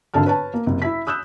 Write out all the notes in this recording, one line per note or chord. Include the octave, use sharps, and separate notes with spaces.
G#1 D3 A4 A5 F6
B4 C#5 A5
A#3
F#1 C3
E4 E5 B6
D#6 E6 F#6 G6 E7